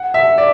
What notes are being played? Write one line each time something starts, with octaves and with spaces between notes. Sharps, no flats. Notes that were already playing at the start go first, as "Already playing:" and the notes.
Already playing: F#5
E5
D5